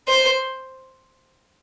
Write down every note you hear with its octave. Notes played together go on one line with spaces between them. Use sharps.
C5